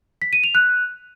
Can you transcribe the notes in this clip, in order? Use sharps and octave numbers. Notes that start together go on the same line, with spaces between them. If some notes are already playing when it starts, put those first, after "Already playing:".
B6
D#7
F7
F#6